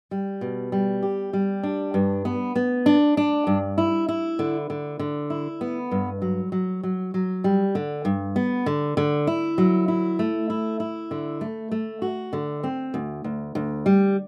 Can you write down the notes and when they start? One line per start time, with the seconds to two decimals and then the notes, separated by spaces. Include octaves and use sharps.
0.11 G3
0.41 B2
0.72 G3
1.03 G4
1.33 G3
1.63 D4
1.94 G2
2.25 B3
2.56 B3
2.86 D4
3.17 D4
3.47 G2
3.78 E4
4.09 E4
4.39 D3
4.70 D3
4.99 D3
5.30 E4
5.61 B3
5.91 G2
6.22 F#3
6.52 F#3
6.83 F#3
7.14 F#3
7.44 G3
7.75 D3
8.05 G2
8.36 B3
8.66 D3
8.97 D3
9.27 E4
9.58 F#3
9.88 E4
10.19 A3
10.50 E4
10.80 E4
11.11 D3
11.41 A3
11.71 A3
12.02 F#4
12.33 D3
12.64 C4
12.94 D2
13.24 D2
13.55 D2
13.86 G3